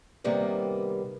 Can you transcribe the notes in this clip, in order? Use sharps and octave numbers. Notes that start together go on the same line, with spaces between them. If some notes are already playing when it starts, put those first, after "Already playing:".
C3 D#3 G3 A#3 B3